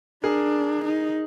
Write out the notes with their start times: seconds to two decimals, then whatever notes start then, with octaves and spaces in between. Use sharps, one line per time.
0.24 D4 G#4 A#4
0.85 D#4